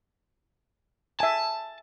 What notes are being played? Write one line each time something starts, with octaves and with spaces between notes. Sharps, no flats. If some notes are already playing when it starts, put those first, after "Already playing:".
E5 G#5 A5